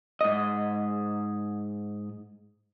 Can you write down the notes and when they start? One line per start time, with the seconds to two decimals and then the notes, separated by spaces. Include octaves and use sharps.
0.21 G#2 D#5